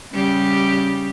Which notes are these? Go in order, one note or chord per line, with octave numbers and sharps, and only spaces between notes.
C#3 G3 G4